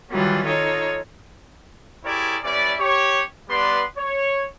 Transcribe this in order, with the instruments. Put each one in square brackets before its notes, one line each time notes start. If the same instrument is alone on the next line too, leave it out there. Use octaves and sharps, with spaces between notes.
[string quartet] D#3 E3 F#3 G3 F4
D#4 F4 A4 C#5
[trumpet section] E4 G4 G#4 A#4 C#5 D5
G3 C#4 E4 B4 D5
G4 C#5
G3 B3 B4 D5 C6
C#5